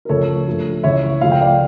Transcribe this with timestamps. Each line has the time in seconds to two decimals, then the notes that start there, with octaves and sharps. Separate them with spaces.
0.05 A#4
0.09 C#2 C#3 F3 A3 A4 C#5
0.47 G2 F3 A3
0.83 C#2 C#3 E3 C#5 E5
1.21 C#2 C#3 F3 A3 F5
1.31 G5
1.41 D5 F5